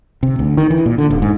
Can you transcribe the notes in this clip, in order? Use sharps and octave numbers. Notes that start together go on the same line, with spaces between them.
C3
D2
D#3
E3
A#2
D3
D#1
G#2